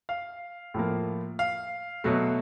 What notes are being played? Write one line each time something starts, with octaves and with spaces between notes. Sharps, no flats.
F5
A2 F3 A#3
F5
B2 F#3 A3